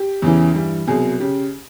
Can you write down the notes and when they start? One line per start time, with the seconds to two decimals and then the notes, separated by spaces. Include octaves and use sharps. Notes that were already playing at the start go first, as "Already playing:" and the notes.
Already playing: G4
0.22 E2 C#3 E3
0.54 G2 E3 G3
0.87 C2 B2 F#3 G#4
1.20 C#3 G4